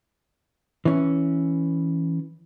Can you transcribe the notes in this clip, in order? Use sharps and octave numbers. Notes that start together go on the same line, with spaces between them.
E3 C#4